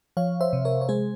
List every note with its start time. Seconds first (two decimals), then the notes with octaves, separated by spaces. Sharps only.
0.17 F3 C#5 F5
0.41 C5 E5
0.53 C3
0.65 A#4 C#5
0.81 C#5
0.89 G#3 G#4 C5